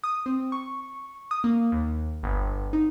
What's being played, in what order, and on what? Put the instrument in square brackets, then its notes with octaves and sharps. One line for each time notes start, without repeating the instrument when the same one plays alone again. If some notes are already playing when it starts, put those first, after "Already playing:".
[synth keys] D#6
C4
C#6
D#6
A#3
D#2
G1
D#4